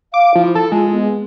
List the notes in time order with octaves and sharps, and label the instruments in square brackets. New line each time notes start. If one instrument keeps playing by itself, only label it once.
[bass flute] F5 [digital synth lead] D6
[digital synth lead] F3 [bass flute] E4
[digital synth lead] A4
[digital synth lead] G#3 [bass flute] F4
[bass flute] B3